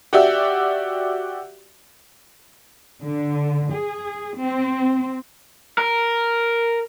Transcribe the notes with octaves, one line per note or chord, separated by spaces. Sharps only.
F#4 G4 D5 E5
D3
G#4
C4
A#4